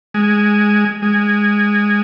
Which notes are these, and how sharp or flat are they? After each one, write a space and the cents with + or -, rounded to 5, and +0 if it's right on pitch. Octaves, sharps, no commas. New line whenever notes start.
G#3 +0
G#3 -10